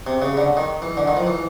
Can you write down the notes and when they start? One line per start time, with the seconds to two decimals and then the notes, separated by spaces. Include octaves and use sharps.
0.07 C3
0.22 C#3
0.37 D3
0.57 D#3
0.82 E3
0.97 D3
1.07 D#3
1.17 F3
1.27 E3